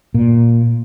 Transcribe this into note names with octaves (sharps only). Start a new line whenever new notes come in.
A#2